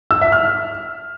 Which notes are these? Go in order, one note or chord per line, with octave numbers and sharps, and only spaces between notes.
E6
E5
F6